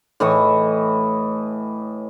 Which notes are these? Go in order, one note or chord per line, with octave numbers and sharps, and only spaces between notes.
A2 E3 D#5 C#6